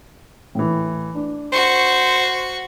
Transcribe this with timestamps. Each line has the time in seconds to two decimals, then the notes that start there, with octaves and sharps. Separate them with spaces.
0.55 A2 E3
1.15 D4
1.52 F#4 C5 C#6